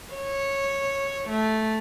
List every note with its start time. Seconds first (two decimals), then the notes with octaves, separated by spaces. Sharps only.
0.13 C#5
1.29 A3